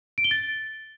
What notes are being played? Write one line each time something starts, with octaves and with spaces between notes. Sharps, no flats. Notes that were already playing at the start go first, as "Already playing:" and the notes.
D7
G7
A6